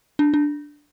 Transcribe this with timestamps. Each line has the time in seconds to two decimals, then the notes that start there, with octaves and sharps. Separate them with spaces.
0.19 D4
0.34 D4